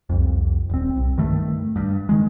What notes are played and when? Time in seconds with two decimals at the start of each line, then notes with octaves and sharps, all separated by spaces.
0.09 C2 F2
0.69 D#1 C4
0.96 C2
1.17 G2 D#3 A3
1.76 G2
2.09 D#3 G#3